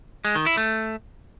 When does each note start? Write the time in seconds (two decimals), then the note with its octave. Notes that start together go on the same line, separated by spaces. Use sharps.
0.25 G#3
0.35 D#3
0.46 E4
0.57 A3